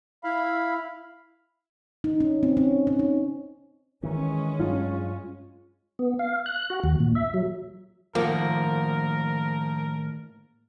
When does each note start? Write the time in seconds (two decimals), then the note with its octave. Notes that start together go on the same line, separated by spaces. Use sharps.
0.24 E4 F5 B5
2.04 D#4
2.20 C#4
2.43 C4
2.57 C#4
2.87 C#4
2.99 D#4
4.03 D#3 E3 G#3 C#4
4.59 G2 F#3 F4
5.99 B3
6.19 F5
6.46 F#6
6.70 F#4
6.84 D#2
7.00 A#2
7.15 E5
7.34 F#3
8.15 A2 D#3 F3 A#3 A#4 F#5